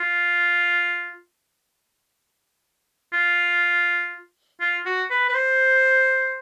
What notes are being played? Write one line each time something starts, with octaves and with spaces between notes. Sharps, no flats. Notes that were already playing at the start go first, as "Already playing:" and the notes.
Already playing: F4
F4
F4
F#4
B4
B4
C5